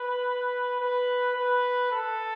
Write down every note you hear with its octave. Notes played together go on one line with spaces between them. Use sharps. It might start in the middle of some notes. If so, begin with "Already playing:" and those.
Already playing: B4
B4
B4
A4